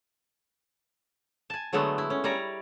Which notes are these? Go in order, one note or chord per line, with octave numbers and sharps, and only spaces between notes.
G#5 A5
D3 F#3 G#3 A3 B3
E4
C#4
G3 C#5 D5 A#5